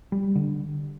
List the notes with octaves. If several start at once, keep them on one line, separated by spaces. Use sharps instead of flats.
G3
D3